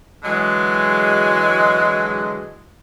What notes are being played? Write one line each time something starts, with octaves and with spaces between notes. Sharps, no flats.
D3 E3 F#3 G#3